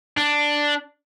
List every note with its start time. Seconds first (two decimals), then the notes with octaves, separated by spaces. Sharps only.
0.18 D4